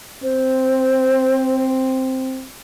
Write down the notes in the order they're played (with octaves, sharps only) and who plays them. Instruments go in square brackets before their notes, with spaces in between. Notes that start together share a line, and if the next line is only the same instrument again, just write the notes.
[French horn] C4 [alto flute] C5